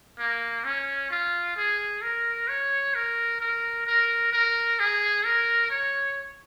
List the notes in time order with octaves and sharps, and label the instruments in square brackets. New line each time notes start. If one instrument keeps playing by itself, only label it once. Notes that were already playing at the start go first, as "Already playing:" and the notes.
[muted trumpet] A#3
C#4
F4
G#4
A#4
C#5
A#4
A#4
A#4
A#4
G#4
A#4
C#5